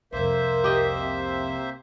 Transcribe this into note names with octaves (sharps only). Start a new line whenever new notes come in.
C2 F2 A#3 A#4 C5 E5
G4 D#5
C3